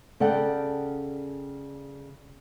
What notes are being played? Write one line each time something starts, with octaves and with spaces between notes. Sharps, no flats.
C#3 A4 D5 F#5 G5